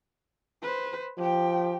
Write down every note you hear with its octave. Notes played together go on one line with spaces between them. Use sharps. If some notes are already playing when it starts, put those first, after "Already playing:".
B4 C5
F3 G4 G5